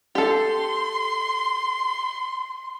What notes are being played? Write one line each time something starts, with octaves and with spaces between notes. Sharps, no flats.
G4 A4 C6